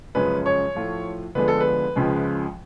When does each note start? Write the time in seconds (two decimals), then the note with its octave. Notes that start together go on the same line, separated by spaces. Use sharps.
0.15 F#2 C#3 F3 G#3 C#4 B4
0.46 C#5
0.75 A2 F3 A3 F4
1.35 D2 D3 F3 G#3 B3 B4
1.48 A4
1.60 B4
1.95 C#2 C#3 F3 G#3